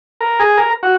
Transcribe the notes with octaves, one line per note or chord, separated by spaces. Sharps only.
A#4
G#4
A#4
F#4